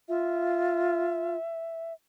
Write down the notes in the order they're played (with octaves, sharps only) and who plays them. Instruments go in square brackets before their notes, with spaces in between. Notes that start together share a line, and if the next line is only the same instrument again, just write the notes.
[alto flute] F4 [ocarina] E5